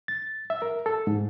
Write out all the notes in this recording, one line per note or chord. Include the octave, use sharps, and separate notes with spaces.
A6
E5
A#4
A4
G#2